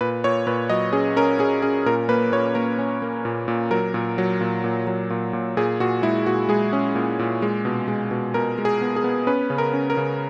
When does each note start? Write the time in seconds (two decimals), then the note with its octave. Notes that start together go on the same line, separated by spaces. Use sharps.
0.01 A#2 B4
0.24 A#2 C#5
0.47 A#2 B4
0.69 F#3 D#5
0.93 C#4 G#4
1.16 C#4 A#4
1.39 C#4 G#4
1.62 C#4 G#4
1.86 A#2 A#4
2.09 A#3 B4
2.32 A#2 C#5
2.55 A#3 A#4
2.79 C#4
3.02 A#3
3.25 A#2
3.48 A#2
3.71 F#3 A#4
3.94 A#2
4.18 F#3
4.41 A#2
4.64 A#2
4.87 F#3
5.10 A#2
5.33 A#2
5.57 A#2 G#4
5.80 A#2 F#4
6.02 G#3 E4
6.26 A#2 F#4
6.49 G#3 G#4
6.73 C#4
6.95 A#2
7.19 A#2
7.42 G#3
7.65 B2
7.88 G#3
8.11 B2
8.34 B2 A#4
8.58 G#3
8.65 G#4
8.81 B3
8.96 G#4
9.04 B3
9.27 C#4 B4
9.50 C#3
9.58 A#4
9.74 C#4
9.90 A#4
9.97 C#3